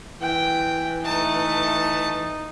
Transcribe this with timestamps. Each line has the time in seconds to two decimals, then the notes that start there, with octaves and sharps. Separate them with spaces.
0.21 E3 G5
1.04 A3 D#4 A5